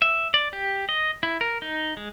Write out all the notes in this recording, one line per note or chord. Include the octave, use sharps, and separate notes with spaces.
E5
D5
G4
D#5
E4
A#4
D#4
G#3